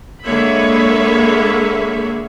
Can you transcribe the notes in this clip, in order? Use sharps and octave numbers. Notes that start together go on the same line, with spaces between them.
D3 G#3 A#3 C#5 E5 B5